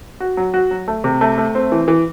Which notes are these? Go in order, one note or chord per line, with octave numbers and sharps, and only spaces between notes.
F#4
F#3
F#4
F#3
A3
C3
A3
A3
C4
E3
E3